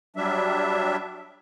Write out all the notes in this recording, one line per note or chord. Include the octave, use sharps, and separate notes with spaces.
F#3 G3 D4 E5